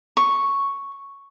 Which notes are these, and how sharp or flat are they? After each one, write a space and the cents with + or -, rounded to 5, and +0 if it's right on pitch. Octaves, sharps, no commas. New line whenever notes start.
C#6 +0